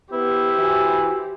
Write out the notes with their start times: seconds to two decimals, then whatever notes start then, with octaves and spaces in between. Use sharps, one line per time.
0.12 B3 E4 G4 C5
0.59 E3 F#4